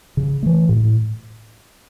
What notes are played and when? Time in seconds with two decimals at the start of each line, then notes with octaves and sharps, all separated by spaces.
0.17 C#3
0.43 E3 A3
0.69 A2